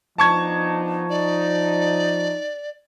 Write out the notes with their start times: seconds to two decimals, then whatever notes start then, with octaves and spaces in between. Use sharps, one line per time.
0.18 F3 B3 D4 D#4 A5 C#6 G#6
1.09 D#4 D5